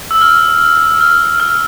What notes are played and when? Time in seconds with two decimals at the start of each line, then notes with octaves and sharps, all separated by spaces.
0.11 E6
0.22 F6
1.01 F6
1.40 F6